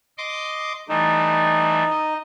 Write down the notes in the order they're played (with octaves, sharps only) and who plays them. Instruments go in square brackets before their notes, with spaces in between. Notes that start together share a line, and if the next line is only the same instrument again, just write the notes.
[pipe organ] D#5 C6 D6
[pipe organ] E3 G3 A3 [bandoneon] D#4
[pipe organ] D#5